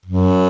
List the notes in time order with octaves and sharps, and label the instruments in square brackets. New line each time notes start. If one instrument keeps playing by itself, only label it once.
[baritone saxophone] F#2